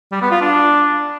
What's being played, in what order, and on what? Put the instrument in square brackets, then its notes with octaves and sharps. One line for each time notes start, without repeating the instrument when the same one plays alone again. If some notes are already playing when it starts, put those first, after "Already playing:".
[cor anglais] G3
B3
F4
D4